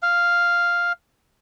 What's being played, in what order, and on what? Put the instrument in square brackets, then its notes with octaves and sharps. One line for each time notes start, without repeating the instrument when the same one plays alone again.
[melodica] F5